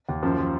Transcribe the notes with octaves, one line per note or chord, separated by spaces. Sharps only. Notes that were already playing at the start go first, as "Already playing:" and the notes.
D#2
F#2 F3
F3